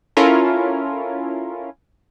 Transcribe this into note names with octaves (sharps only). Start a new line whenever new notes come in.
C#4 E4 F4 A4 A#4